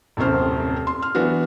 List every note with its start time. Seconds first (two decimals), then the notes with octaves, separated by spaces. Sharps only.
0.17 D#1 F#2 A2 C3 C5 F6
0.87 C6
1.02 F6
1.15 E3 B3 D4 F#4